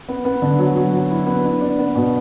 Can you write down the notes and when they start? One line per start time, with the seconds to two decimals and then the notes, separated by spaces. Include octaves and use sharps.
0.09 B3
0.25 B3
0.42 D3
0.59 F#3
0.76 F#3
0.93 F#3
1.11 E4
1.27 B3
1.44 D4
1.61 D4
1.79 B3
1.95 B2